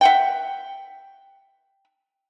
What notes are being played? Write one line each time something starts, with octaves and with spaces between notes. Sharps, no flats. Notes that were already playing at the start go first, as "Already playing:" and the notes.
E5 F#5 G5